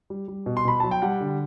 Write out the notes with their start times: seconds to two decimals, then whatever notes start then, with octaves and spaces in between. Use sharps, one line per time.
0.10 G3
0.28 G3
0.46 B2
0.57 C6
0.65 B2 B5
0.80 F#3 A5
0.91 G5
1.02 G3 F#5
1.21 D3